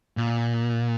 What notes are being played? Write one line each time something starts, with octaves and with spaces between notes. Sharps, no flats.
A#2